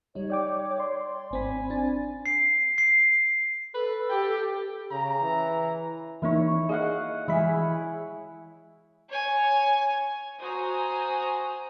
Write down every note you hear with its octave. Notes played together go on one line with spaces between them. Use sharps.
G3 D#4 C#5
D5 G5 D6
D5 C6
G#1 C4 G#5 B5
D4 A6
C7
C7
A4 B4
G4 G5
C#3 A#5
E3
E3 A#3 D#4 E4 C#5
G#4 D#5 F5 F#5
E3 G#3 E4 G#4 B5
C#5 G#5
F#4 C5 G#5 A#5 D#6